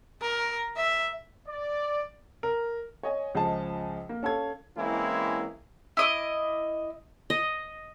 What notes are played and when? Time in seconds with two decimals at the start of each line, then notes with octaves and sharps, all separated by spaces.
0.22 A#4
0.77 E5
1.48 D5
2.43 A#4
3.03 C#5 D#5 G#5
3.35 C#2 F3 G#4 D#5 G#5 A5
4.09 A#3
4.23 C#4 A4 F5 G#6
4.77 E3 G#3 A#3 C4 C#4 E4
5.97 E4 D#5 D6
7.30 D#5